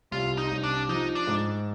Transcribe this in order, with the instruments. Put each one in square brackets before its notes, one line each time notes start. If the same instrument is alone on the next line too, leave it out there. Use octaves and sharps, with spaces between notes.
[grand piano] C2 [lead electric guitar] F4
[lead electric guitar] D#4
[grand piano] C2
[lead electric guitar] D4
[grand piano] F3 [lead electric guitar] D#4
[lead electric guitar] D4
[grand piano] G#2